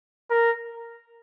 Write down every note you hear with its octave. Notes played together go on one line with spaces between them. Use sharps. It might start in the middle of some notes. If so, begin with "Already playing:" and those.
A#4